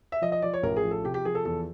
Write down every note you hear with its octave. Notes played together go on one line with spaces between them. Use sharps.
E5
F3 D#5
D#5
F3 D5
C#5
A1 A#4
G#4
F3
A4
C3 G4
G4
F3 G#4
A4
E2 A4